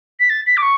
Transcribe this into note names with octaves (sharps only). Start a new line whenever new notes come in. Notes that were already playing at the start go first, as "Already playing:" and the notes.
B6
A6
B6
D6
C#6